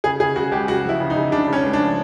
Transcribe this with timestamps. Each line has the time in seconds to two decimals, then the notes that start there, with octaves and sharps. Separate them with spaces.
0.04 C#3 G#4
0.20 C#3 G#4
0.36 C#3 F#4
0.52 C#2 G4
0.68 C#3 F#4
0.84 F3 E4
1.00 C#3
1.10 D#4
1.16 C#3
1.31 C#3 D4
1.48 C#3
1.53 C#4
1.63 C#2
1.73 D4
1.79 F3